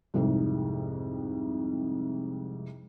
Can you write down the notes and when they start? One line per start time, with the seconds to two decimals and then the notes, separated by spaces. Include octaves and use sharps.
0.14 C2 F2 G#2 C3